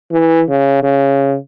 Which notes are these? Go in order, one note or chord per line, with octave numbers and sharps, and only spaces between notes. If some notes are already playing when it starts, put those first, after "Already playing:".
E3
C#3
C#3